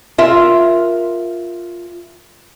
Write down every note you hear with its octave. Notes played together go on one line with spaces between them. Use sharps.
F4 A#4 E5